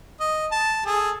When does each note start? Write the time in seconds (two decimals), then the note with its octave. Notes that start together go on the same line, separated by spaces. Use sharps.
0.20 D#5
0.51 A5
0.86 G#4 A4